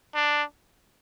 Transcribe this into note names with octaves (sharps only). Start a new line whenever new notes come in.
D4